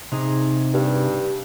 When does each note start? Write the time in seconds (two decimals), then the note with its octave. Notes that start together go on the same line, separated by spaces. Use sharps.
0.12 C3 D#4 G#4
0.74 G2